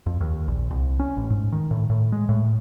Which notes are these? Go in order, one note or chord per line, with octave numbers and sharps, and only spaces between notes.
F2
D#2
A#1
C2
C#4
A1
G#2
D#3
A2
A2
G#3
A2